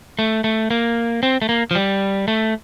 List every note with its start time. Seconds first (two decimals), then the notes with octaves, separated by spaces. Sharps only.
0.19 A3
0.44 A3
0.71 A#3
1.23 C4
1.42 A3
1.49 A#3
1.71 F3
1.75 G3
2.28 A3